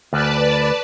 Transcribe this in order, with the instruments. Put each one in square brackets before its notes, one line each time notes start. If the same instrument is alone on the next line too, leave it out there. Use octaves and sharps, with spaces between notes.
[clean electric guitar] D2 [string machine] B4 D5 A5